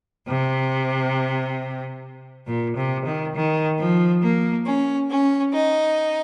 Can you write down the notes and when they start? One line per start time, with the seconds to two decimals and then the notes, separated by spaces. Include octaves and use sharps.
0.27 C3
2.46 A#2
2.76 C3
3.05 D#3
3.35 D#3
3.78 F3
4.22 A#3
4.65 C#4
5.10 C#4
5.53 D#4